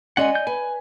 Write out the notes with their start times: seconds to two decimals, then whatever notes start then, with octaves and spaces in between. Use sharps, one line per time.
0.17 G#3 C#4 D5 D#5 F#5 G#5
0.35 G6
0.47 B4 G#5